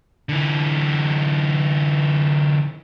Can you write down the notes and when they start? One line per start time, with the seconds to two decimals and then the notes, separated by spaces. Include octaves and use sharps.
0.29 D3 E3